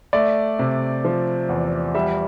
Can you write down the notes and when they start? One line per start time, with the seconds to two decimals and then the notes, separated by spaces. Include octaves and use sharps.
0.13 A3 D5
0.59 C3
1.05 F3
1.49 E2
1.95 G3 E5